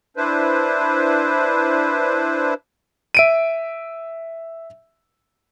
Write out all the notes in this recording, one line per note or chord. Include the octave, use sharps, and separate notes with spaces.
D4 E4 B4 C5
E5 D7 D#7